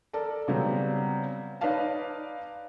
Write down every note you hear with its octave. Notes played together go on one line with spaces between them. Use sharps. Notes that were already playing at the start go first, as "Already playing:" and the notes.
A4 A#4 D5 A5
C#3 F#3 G3 B3 C4
D#4 B4 C#5 D5 F5 A5